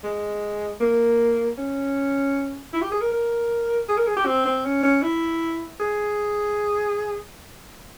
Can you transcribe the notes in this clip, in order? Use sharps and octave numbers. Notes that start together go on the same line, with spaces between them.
G#3
A#3
C#4
E4
G4
G#4
A#4
A#4
G#4
A#4
G#4
G4
C4
C4
C#4
C#4
E4
G#4